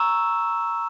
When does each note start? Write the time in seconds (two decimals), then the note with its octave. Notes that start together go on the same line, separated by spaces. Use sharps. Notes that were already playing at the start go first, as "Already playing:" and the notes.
Already playing: A#5 C#6 E6 E7